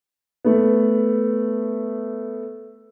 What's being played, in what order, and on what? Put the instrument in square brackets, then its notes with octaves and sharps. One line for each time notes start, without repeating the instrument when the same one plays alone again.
[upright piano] A3 B3